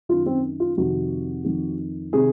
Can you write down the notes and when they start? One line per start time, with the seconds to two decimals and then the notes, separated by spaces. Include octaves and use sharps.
0.09 F#2 D#3 F4
0.26 C4
0.60 F4
0.77 F2 C3 D#3 F#4
1.44 F2 D#3
2.12 C3 D#3 G#4